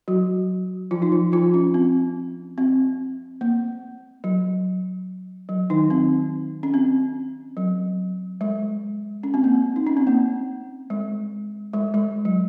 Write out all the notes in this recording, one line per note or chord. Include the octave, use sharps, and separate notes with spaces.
F#3 F#4
F3 F4
D#4
F3 F4
F3 F4
C#4
C4
C4
A#3
F#3
F#3
D#3 D#4
C4
C#4
C4
F#3
G#3
C#4
C4
A#3
C4
D#4
C#4
C4
A#3
G#3
G#3
G#3
F#3